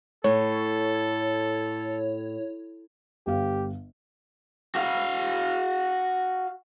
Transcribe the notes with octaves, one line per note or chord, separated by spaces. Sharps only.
A2 A4 C#5
G1 G4 F5
F#4 F5